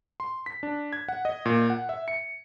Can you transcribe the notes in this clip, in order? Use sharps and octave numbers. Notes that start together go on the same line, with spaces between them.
C6
B6
D4
G#6
F#5
D#5
A#2
F#5
E5
C#7